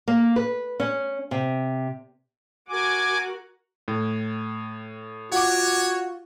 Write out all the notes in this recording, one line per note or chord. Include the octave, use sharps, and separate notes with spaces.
A#3
B4
C#4
C3
F#4 A#4 G#5 D6
A2
F4 F#4 C#5 F#5 D6